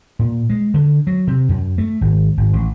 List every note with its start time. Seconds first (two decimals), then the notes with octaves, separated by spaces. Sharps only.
0.19 A#2
0.50 G#3
0.74 D3
1.07 F#3
1.27 C3
1.49 F#2
1.78 A3
2.01 G#1
2.37 G#1
2.53 A1